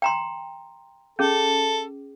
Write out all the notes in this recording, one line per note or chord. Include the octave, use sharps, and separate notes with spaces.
G5 A#5 C6
C#4 G#4 A4